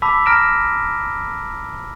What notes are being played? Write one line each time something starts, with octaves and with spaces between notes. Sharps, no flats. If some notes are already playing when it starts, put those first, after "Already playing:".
A5 B5 D6 E6 B6
A#5 F6 A#6 D7 E7